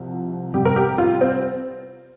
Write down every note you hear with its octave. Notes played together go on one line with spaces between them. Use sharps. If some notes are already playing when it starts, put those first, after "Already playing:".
Already playing: C2 C3 F3
C2 C3 G3 G4
A#4
G4
F4
C4